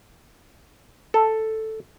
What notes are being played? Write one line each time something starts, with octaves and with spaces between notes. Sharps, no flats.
A4